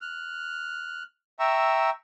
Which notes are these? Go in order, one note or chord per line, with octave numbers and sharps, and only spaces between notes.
F6 F#6
E5 G5 A#5 C#6 E6